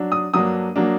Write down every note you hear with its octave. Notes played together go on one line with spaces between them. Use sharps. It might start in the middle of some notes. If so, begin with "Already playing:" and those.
Already playing: F#3 D4
D#6
G2 F#3 A#3 D4 D#6
F#3 A#3 D4